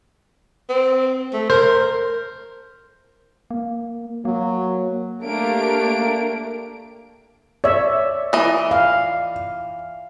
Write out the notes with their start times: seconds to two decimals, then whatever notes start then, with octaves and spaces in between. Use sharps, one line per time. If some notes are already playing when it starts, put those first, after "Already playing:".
0.69 C4
1.33 A3
1.50 A#4 C5
3.51 A#3
4.25 F#3 A#3
5.24 A3 A#3 D4 G4 D7
7.64 C#5 D5 E5
8.33 E3 D#5
8.71 F5